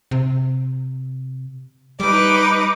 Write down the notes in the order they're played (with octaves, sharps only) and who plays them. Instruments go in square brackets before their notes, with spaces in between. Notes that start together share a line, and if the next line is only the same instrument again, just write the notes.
[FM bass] C3
[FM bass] G3 [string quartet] D#4 B4 D6